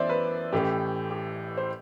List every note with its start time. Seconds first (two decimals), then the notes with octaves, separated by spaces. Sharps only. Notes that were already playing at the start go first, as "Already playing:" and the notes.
Already playing: F#2 E3 B3 C5 D5 E5
0.09 B4
0.53 A1 A2 E3 A3 G4
1.11 G4
1.57 C5